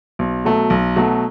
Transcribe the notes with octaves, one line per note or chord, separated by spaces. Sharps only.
B1
B2 F#3 A3
B1
B2 F#3 A3